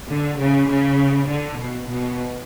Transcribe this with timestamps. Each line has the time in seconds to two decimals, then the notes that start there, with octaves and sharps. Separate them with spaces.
0.10 D3
0.40 C#3
0.69 C#3
1.29 D3
1.58 B2
1.88 B2